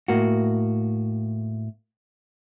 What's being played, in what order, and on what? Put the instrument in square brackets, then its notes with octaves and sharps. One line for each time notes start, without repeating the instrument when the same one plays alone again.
[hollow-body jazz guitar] A2 A#3 F#4